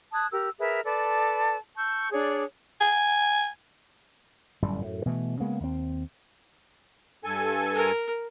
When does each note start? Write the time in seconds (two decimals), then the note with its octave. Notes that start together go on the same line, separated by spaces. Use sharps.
0.13 A5 D#6 F#6 G#6
0.31 G4 A#4 E6
0.59 G#4 A#4 B4 E5
0.85 A4 B4 D5 A5
1.76 A5 C#6 E6 G6
2.12 D4 G#4 C#5 D5
2.81 G#5
4.62 G1 F#2 A2 G3
4.82 F#2 A2
5.06 B2 E3 A3
5.40 C#3 G#3 A#3 B3
5.60 D#2 C4
7.24 G2 A4 G#5
7.74 A#4